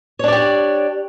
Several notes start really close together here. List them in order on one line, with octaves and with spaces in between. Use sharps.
C#5 D4 D5 G4